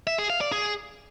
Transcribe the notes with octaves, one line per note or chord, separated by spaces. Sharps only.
E5
G#4
F5
D5
G#4